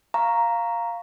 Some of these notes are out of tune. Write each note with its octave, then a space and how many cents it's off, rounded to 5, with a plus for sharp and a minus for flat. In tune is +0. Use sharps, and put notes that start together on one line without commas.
F5 +0 A#5 +0 C#6 +0